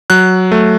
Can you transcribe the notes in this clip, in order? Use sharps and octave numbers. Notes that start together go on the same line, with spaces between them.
F#3 F#6
A3